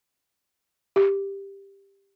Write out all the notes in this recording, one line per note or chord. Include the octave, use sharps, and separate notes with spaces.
G4